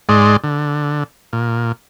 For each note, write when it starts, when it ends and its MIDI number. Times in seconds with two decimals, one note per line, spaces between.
0.09 0.37 44
0.09 0.37 56
0.09 0.37 74
0.09 0.37 84
0.44 1.04 50
1.33 1.72 46